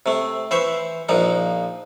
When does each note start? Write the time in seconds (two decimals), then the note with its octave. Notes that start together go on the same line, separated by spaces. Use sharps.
0.06 C3 A3
0.51 E3 C5 E5 C#6
1.09 A#1 A#2 F3 D#4